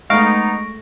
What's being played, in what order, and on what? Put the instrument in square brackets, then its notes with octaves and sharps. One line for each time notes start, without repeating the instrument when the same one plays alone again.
[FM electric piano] G#3 A3 [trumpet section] B3 D#4 [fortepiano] F5 [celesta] C#6 A#6 D7